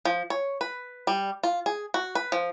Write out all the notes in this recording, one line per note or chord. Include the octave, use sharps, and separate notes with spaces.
F3
C#5
B4
G3
F4
G#4
F#4
B4
F3